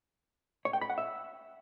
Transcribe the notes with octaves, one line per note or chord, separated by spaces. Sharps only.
C#5
G5
B5
F#5
E5